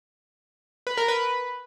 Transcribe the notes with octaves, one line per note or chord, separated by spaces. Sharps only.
B4
A#4
B4